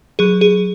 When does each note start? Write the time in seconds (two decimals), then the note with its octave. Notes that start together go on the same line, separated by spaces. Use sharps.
0.19 F#3 G#4
0.41 G#4